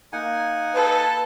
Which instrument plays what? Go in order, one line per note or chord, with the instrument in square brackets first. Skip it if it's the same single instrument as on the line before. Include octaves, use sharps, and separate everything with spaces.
[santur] A#3 [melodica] D#4 F#5 G#5
[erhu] A4 [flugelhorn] B4